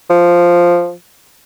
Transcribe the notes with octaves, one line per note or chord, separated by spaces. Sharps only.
F3